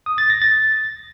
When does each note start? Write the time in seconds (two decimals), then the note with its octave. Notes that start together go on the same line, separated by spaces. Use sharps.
0.06 D#6
0.18 A6
0.30 A#6
0.42 A6